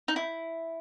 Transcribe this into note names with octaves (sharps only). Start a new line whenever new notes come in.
D#4
E4